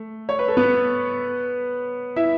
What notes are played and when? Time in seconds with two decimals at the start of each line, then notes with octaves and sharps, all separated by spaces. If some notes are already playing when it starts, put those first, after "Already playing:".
Already playing: A3
0.29 C#5
0.39 B4
0.48 A4
0.57 B3 B4
2.16 E4 E5